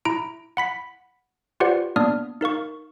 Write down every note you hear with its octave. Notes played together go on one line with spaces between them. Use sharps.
E4 A#5 D7
F#5 B5 B6
F4 G4 B4 C5 D5 F#5
A#3 B3 D4 D5 D#6 F6
D#4 A#4 F5 C#6